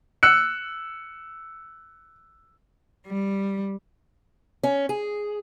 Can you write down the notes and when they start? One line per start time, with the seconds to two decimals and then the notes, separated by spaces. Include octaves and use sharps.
0.23 E6 F#6 C#7
3.07 G3
4.63 C#4
4.89 G#4